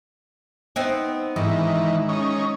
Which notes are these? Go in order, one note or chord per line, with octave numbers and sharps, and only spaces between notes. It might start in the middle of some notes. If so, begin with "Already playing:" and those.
B3 C4 D#4
G#2 D#3 E3
C#4 D#4